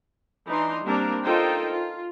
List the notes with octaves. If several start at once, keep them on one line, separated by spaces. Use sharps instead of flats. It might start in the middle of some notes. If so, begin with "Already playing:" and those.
E3 D4 D#4 A#5 C6
G3 A#3 C4 D4 A#4 A#5
D#4 F4 A4 A#4 C5 G5
F4